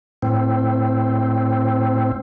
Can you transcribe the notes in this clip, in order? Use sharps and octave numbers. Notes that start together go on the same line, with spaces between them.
A2 C4